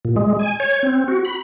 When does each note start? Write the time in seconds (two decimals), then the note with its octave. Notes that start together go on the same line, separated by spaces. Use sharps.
0.05 A#2
0.16 G#3
0.39 G#5
0.60 C#5
0.83 C4
1.08 F#4
1.25 B5